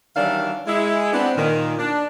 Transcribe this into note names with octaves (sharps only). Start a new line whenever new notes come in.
D#3 E3 F#3 G3 D4 F5
G#3 E4
B3 C4 D4
A#2 D#3
D4